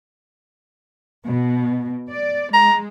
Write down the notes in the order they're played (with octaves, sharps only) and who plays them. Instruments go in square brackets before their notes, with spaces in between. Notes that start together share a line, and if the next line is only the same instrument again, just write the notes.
[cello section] B2
D5
[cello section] G#3 [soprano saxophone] A#5